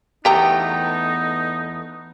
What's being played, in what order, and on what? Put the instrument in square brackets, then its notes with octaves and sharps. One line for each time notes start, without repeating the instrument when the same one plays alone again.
[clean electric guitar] E2 A3 B3 [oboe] D#4 [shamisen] G4 G5 A#5